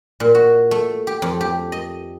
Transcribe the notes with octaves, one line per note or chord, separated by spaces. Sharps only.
A#2
F#4
A3
G4
F2
G4
D#5